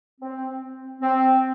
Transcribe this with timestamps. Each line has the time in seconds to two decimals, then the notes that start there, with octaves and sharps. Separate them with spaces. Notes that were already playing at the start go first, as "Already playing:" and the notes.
0.21 C4
1.02 C4